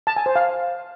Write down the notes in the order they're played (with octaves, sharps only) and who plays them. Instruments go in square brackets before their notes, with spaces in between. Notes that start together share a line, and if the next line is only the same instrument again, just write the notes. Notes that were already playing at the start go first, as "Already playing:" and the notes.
[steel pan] A5
G#5
C5
F5